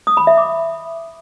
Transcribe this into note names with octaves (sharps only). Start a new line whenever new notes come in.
D#6
B5
E5
D6